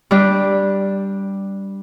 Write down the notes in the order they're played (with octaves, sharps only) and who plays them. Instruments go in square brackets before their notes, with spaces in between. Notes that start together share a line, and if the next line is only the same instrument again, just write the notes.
[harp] G3 D4